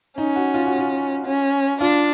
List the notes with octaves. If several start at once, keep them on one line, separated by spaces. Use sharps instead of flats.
C#4 D#4
F#4
F4
F#4
F4
C#4
D4 F4